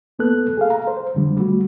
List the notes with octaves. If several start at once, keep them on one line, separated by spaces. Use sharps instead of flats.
E2 A#3 B3 A4 F#6
G#4 A4 F5
A#5
C5
F2 D3 G3
G3 A3 F#4